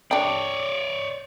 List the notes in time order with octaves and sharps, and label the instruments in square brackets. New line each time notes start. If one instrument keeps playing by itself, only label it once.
[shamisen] D4 G4 [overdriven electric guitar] C#5 D5